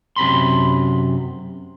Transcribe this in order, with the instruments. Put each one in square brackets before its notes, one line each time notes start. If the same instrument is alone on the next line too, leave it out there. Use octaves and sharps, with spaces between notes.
[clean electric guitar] F#2 C3 B5 C6